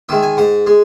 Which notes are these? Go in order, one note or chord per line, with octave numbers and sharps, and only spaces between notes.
D#3 G#3 E5
G#5
G#2 F#5
G#3